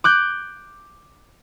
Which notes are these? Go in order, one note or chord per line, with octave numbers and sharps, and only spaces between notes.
D6 F#6 G6